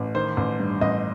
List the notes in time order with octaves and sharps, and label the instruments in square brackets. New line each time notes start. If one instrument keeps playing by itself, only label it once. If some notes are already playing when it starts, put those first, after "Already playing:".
Already playing: [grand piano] A1
D#3 C5
A1
G2
A1 D#5